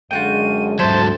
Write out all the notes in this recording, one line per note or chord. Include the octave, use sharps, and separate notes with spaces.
F#2 D3 G#3 F4 F#4 G5 D#7
D2 G#2 F#3 C5 E5 A5